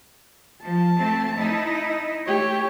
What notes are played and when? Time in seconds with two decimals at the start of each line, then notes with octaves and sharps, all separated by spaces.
0.64 F3 A5
0.97 A3 C4
1.38 D#4 E4
2.27 A3 G4 C#5